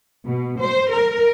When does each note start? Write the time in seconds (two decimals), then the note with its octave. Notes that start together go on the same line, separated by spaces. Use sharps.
0.24 B2
0.60 C5
0.92 A#4